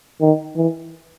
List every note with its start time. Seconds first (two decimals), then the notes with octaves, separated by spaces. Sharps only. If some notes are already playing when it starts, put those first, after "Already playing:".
0.21 D#3
0.56 E3